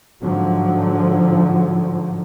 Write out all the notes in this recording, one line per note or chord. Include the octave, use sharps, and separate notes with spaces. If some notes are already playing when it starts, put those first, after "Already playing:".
G#2 D3 F3 F#3